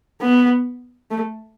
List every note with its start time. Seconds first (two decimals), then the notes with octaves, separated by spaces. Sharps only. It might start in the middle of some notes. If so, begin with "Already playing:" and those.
0.22 B3
1.11 A3